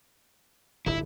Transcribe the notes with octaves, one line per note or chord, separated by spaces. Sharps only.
D1 G1 E4